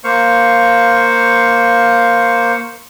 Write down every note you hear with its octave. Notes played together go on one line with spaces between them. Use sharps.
A#3 C5 F5 C#6